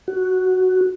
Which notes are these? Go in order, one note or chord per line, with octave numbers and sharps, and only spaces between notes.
F#4